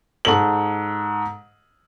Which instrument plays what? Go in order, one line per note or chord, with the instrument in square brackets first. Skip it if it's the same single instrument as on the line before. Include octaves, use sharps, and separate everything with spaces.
[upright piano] G#2 A4 F#7